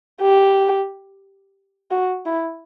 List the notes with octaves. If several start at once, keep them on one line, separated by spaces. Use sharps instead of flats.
G4
F#4
E4